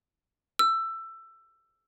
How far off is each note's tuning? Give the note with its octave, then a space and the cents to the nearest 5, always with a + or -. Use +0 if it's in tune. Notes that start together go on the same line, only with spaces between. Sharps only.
E6 +15